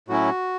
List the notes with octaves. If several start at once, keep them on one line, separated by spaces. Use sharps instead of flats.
A2 F#3 C#4 E4 F#4